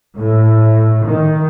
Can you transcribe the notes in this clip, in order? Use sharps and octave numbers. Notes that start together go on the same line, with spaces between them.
A2
D#3